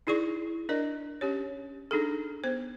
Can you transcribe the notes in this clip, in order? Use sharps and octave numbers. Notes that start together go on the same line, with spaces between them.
D#4 E4 G#4 D5 C#6
D4 A#4 D5 D#5
C#4 G4 C#5
D4 D#4 G#4 A4
B3 C5